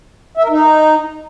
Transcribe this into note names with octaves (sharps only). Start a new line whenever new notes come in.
E5
A#4
D#4